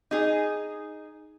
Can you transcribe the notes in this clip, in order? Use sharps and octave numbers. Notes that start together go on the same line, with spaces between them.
D#4 G#4